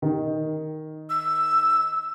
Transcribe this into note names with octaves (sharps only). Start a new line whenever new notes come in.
D#3
E6